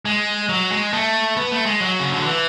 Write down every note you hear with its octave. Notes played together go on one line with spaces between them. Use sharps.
G#3
F#3
G#3
A3
B3
A3
G#3
F#3
C#3
D3
E3